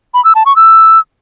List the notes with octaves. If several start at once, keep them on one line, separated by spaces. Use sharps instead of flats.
B5
E6
A5
C#6
E6